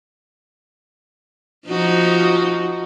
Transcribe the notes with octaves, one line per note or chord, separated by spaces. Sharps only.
F3 D#4 F#4